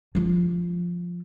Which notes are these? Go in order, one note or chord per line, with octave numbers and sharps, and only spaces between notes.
F3 F4